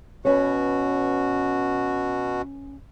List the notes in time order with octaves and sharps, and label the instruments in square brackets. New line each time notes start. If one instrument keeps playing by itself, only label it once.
[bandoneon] B2 F#4 [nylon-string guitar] C#4 B4 C#5